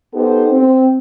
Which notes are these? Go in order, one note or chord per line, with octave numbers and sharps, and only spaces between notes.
B3 D#4 G4 A4 C5
C4